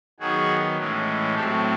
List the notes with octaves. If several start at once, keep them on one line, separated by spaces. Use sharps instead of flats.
D#3 F#3 B3 F#4 G#4
A2 E3 G#3 C#4
A2 F#3 A3 C4 G4 A4